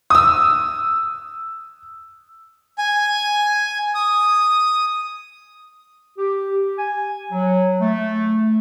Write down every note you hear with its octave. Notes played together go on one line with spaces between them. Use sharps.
D#6 E6
G#5
D#6
G4
G#5
F#3
A3